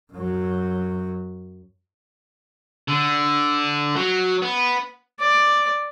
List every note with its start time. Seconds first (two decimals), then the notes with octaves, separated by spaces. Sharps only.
0.13 F#2 F#3
2.88 D3
3.96 F#3
4.42 B3
5.20 D5